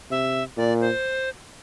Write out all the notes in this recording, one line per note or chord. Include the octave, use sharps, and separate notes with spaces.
C3 E5
A#2 D5
C5